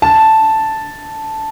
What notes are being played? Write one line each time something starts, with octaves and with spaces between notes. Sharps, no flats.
A5